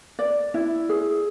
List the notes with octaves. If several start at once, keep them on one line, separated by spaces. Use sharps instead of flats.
D5
E4
G#4